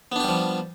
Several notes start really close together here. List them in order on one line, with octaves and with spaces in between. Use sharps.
B3 D4 G4 G3 F3